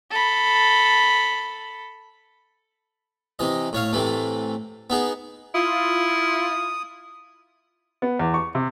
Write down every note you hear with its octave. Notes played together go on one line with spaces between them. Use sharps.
A4 B5
C3 E3 D#5
A2 C#5 F5
A2 C3 E3 A3
B3 D#4 G#4
E4 F4 D#6
B3
E2
C#6
C3